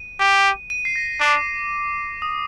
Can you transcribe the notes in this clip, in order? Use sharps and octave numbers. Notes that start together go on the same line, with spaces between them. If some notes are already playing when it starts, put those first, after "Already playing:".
Already playing: D#7
G4
D#7
C7
A#6
D4 D6
D#6